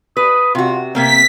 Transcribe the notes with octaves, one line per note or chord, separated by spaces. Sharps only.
B4 D#6
C3 F4 F#4
C3 A#3 C4 A#5 B6